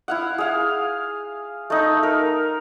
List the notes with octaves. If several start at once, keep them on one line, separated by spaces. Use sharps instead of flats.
E4 F5 F#5
G#4 F5
A3 D#4
A#4